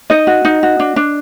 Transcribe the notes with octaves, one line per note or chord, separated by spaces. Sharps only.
D#4 D#5
F#4
D#4
F#4
D4
D4